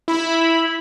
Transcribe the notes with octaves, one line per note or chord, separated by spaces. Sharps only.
E4 B5